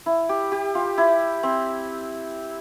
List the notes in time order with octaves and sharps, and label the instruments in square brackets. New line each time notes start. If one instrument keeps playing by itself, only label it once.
[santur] E4
G4
G4
F4
E4
C4